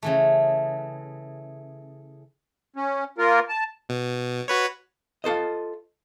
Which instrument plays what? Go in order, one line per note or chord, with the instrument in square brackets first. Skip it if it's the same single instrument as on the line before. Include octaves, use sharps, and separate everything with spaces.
[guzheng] C#3 E3 A3
[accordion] C#4
A#3 F4 A#4
A5
[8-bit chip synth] B2
F#4 B4 C#5
[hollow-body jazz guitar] F4 A4 C5 D#5